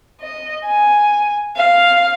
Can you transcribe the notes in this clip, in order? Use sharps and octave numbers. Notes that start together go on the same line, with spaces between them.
D#5
G#5
F5